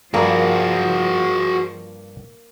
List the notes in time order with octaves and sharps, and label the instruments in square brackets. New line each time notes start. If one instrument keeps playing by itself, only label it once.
[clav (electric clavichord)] G2 [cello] F3 [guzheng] A#3 [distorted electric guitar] F#4 G#4